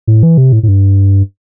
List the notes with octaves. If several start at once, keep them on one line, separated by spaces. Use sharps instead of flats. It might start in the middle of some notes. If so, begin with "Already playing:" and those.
A2
E3
C3
A2
A2
G2